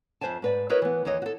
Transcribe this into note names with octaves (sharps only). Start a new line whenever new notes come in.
F2 E3 C5 E5 G#5 A5
G#2 B4 D5
E4 F#4 A#4 B4 C#5 D#5
E3 B3
D#2 E3 C#5 D#5
F#4 A4